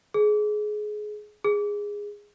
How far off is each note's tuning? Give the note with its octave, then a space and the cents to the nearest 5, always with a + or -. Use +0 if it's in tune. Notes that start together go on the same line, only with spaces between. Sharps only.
G#4 +20
G#4 -10